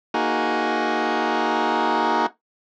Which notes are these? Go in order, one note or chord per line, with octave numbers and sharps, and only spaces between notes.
A#3 D#4 F#4 G#4